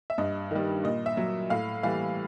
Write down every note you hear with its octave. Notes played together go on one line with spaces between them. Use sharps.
E5
G2 D#5
D#3 G3
A#2 D#5
E5
F#3
A2 F5
E3 G3 F5